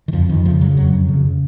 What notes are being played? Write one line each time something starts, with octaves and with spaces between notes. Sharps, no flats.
D#3
F2 F3
F2 D#3
C#3 F3
C#3 F#3
F2 F#3
F2
C#3
C#3